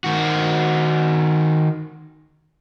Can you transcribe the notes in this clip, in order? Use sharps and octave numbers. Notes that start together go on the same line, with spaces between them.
D#3 F#4